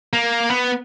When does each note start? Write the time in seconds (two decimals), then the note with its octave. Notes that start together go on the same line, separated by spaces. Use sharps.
0.13 A#3
0.50 B3